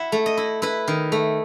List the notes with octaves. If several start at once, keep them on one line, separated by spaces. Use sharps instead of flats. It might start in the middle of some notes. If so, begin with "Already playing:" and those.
Already playing: E4 E5 F#5
A3
D#5
E4
E4 B4
D#3
A3